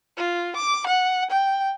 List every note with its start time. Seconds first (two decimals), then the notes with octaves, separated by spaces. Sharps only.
0.17 F4
0.56 D6
0.87 F#5
1.30 G5